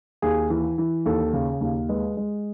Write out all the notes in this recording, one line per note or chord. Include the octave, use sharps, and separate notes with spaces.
D#2 G#4
E3
E3
D#2 A4
C#3
D#2
G#3 B4
G#3